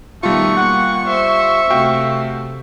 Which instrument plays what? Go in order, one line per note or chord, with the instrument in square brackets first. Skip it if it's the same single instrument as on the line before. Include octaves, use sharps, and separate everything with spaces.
[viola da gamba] B2 D#3 [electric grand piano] G3 F4 [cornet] A3 [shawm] C#6
[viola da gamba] A#3 [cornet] F#5
[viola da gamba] C5 [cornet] E5
[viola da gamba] C3 A3 [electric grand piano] F#4 F5 G5